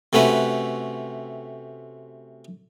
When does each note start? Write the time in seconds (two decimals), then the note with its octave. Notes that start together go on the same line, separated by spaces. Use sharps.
0.13 C3 A3 C#4 F#4 B4